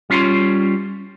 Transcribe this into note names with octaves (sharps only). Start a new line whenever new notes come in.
G3 C#4 F4 A#5 C6